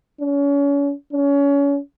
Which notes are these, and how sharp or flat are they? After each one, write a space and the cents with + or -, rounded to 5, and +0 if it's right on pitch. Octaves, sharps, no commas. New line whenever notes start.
C#4 +35
C#4 +30